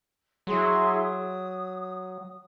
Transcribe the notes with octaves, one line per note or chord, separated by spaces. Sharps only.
F#3 E4 G#4 C6
D#6